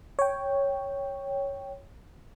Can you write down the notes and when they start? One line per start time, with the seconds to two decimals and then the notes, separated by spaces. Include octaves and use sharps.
0.19 C#5 G5